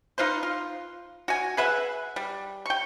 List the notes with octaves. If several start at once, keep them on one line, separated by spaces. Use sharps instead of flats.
D#4 F4 B4 C5
F4
F#4 G#5
G#4 B4 E5 F#5
G3
G5 C#6